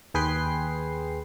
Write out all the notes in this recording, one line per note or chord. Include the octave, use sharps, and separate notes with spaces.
D#2 G#4 B4 G5 C6 C7